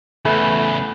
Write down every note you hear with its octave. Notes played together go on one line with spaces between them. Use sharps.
E2 C#3 A3 B4